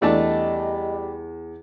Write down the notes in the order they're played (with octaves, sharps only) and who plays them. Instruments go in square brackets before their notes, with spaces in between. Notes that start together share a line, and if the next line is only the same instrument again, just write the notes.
[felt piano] E2 [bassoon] G3 [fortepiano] A3 D4 A5 [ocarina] D#5